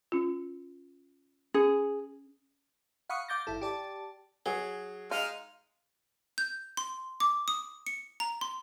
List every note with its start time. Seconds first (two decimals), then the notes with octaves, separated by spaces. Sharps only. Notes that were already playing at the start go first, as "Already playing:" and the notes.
0.12 C#4 F4
1.54 C#4 G#4
3.10 F5 F#5 B5 C#6 D#6
3.29 F5 D6 G6 A6 A#6
3.47 G#1 E4 A4
3.61 G4 D5 A5
4.46 F#3 G#4
5.11 G#3 D#4 F5 F6
6.38 G6
6.77 C6
7.20 D6
7.48 D#6
7.87 C#7
8.20 A#5
8.41 C6